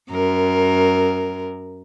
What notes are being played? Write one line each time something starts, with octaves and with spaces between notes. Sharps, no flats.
F#2 A#4